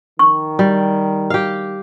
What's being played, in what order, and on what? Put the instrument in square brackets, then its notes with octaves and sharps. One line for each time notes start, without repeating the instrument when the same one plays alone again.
[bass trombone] D#3 [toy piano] C#6
[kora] G3
G4 F5